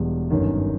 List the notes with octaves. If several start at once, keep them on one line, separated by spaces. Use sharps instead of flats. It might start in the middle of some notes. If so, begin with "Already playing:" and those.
Already playing: E1 E2 B2 G3
G1 F#2 D#3